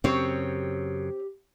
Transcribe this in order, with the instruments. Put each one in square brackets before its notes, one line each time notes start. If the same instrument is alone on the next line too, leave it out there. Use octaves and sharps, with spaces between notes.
[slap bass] F#2 C#3 [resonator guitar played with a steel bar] C4 C#5 [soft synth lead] G4